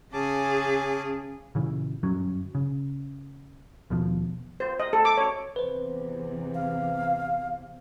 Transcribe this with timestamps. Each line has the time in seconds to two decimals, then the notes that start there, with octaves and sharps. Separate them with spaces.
0.13 C#3 C#4 G#4 A5 D6
1.55 A#2 C#3 E3
2.03 G1 F#2 F#3 C#4
2.55 C#3
3.90 D#2 B2 F3
4.60 C5
4.80 D#5
4.93 A4
5.05 D6
5.18 C#5
5.56 E2 C3 E3 B4 C5
6.55 F5